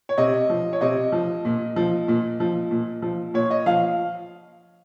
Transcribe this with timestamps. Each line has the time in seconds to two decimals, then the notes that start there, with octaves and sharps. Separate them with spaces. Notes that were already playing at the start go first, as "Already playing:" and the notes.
0.09 C#5
0.18 C3 D#5
0.50 F3
0.73 C#5
0.81 C3 D#5
1.12 F3
1.45 A#2
1.76 F3
2.08 A#2
2.40 F3
2.71 A#2
3.02 F3
3.34 A#2 C#5
3.50 D#5
3.66 F3 F5